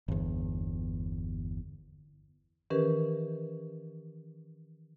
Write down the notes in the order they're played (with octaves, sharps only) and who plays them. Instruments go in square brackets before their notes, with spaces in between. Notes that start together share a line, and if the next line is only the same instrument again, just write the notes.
[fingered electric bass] G1 E2
[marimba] D#3 E3 C#4 G4 A#4 B4